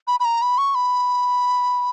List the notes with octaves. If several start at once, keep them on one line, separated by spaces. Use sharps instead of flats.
B5
B5
A#5
B5
C#6
B5